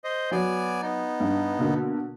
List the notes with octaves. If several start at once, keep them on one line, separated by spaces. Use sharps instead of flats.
C5 D#5
F#3 B3 D5 G#5
B3 D#4
G2
B2 D3 A#3